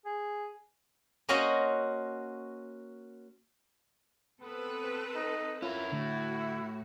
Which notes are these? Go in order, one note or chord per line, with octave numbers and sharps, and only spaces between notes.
G#4
A#3 C#4 F#4 C5 D#5 F#5
B3 C4 A4 B4
D#4
C#4 E4 F4 A#4
A2 D3 F#4